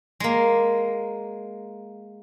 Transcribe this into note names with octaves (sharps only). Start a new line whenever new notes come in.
G#3 A#3